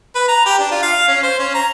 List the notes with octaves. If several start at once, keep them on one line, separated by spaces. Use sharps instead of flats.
B4
A#5
G4
D4
F4
F5
C#4
C5
C#4
A#5